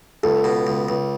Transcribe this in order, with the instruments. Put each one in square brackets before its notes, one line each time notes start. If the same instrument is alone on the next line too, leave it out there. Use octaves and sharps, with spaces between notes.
[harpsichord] C#2 [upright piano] A4
[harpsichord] B2
C#2
C#2